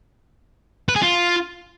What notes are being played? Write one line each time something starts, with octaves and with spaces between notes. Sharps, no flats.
B4
G#4
F4